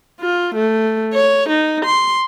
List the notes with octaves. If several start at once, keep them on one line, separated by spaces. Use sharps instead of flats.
F4
A3
C#5
D#4
C6